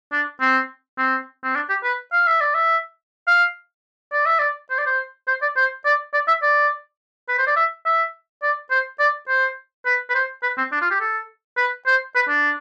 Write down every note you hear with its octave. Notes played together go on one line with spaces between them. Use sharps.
D4
C4
C4
C4
D4
G4
B4
F5
E5
D5
E5
F5
D5
E5
D5
C5
D5
C5
C5
D5
C5
D5
D5
E5
D5
B4
C5
D5
E5
E5
D5
C5
D5
C5
B4
B4
C5
B4
C4
D4
F4
G4
A4
B4
C5
B4
D4